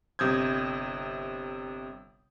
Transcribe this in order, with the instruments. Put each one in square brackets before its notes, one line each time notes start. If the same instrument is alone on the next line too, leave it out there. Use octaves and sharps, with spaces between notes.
[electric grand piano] G1 C3 D#6 G6 G#6